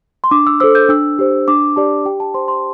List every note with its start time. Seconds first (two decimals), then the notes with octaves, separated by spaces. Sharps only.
0.24 C6
0.31 D4 D6
0.47 E6
0.60 A4 C5 E6
0.75 G6
0.89 D4 E6
1.19 G4 C5
1.48 D4 D6
1.76 G4 D5 A5
2.05 G4 G5
2.20 A5
2.34 C5 C6
2.48 C6